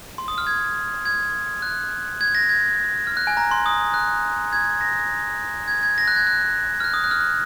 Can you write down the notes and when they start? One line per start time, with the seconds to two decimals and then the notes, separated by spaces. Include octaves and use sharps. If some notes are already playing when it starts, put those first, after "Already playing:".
0.18 C6
0.28 D#6
0.38 F6
0.47 G#6
1.05 G#6
1.62 F#6
2.21 G#6
2.35 A#6
2.49 G#6
3.07 F6
3.17 F#6
3.27 G#5
3.37 A#5
3.51 C6
3.66 D#6
3.94 F#6
4.53 G#6
4.81 A#6
5.68 G#6
5.83 G#6
5.98 A#6
6.08 F#6
6.16 G#6
6.27 F#6
6.80 F6
6.84 F#6
6.94 D#6
7.04 F#6
7.11 F6
7.20 F#6